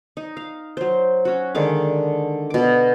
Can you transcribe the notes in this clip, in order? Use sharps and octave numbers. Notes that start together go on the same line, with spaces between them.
D#4
F5
F#3 C5
C#4 F#4
D3 D#3 G#3 F5
B2 D6